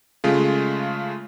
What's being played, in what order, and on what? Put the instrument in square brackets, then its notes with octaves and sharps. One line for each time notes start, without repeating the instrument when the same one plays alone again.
[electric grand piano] C#3 G#3 A3 F4